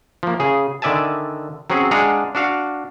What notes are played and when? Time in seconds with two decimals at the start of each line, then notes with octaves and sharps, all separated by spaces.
0.23 F3 A#3
0.40 C#3 G#4
0.82 D3 D#3 D5 E5 G#5 A5
1.70 F#3 C4 C#4 G#4
1.91 G#3 D4 G#4 F5 F#5 A#5
2.35 D4 F#4 F5